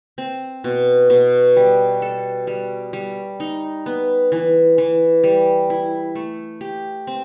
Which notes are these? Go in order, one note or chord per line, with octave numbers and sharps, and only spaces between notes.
C4
B2
B2
G3
A4
G3
G3
D#4
B3
E3
E3
G3
E4
A3
G4
C4